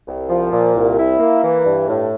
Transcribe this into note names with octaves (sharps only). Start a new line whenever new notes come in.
C2
F3
A#2
C2
E4
A#3
E3
G2
A2